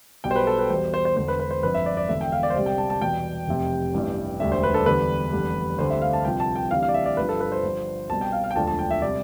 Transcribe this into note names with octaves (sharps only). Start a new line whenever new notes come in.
B1 B2 G3 G5
C5
B4
A4
B4
E2 B2 G3 C5
C5
C5
E1 E2 D3 C5
B4
B4
C5
G1 F2 D3 B4
E5
D5
D5
E1 E2 D3 E5
G5
F5
D5
C5
C2 C3 G3 D5
G5
A5
A5
E2 B2 G3 G5
F1 F2 C3
A1 G2 E3 G3
E1 D2 D3 G3 E5
C5
B4
A4
E2 D3 G3 B4
F1 E2 D3 G3
D2 D3 G3 C5
E5
F5
A5
C2 C3 F3 G5
A5
G5
D2 C3 E3 G3 F5
F5
D5
E5
D5
G1 G2 F3 B4
A4
B4
C5
G1 G2 F3
C2 B2 G3 A5
G5
F5
F5
G5
E1 D2 D3 F3 A5
A5
G5
E5
C3 G3 D5